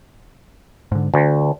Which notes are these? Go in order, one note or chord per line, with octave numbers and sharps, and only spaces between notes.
G#2 D3
D2 D3